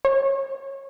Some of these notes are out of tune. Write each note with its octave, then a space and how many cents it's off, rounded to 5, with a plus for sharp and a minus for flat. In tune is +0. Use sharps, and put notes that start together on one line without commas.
C#5 -25